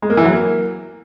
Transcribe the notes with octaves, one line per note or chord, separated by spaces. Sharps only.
G#3
A#3
E3
F#3
A#3